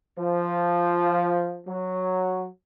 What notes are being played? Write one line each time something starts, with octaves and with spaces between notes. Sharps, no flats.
F3
F#3